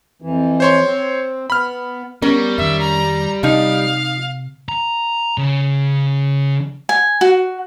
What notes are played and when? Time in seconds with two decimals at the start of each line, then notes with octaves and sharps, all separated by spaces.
0.22 F2 E3
0.60 C5 C#5 C6
0.85 C4
1.50 B3 B5 F6
2.22 G3 B3 C#4 A#4
2.58 F2 D#3 E5
2.80 A#5
3.43 C3 F3 D#4 F5
4.69 A#5
5.38 C#3
6.89 G#5
7.21 F#4